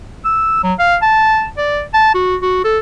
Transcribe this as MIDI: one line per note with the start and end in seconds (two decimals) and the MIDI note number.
0.25 0.59 88
0.64 0.74 54
0.79 0.96 77
1.02 1.47 81
1.58 1.82 74
1.94 2.12 81
2.14 2.36 66
2.42 2.63 66
2.64 2.79 69